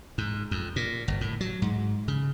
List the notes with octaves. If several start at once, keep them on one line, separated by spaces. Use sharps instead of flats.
G#2
F2
A#2
G1
A2
F#3
G#2
C#3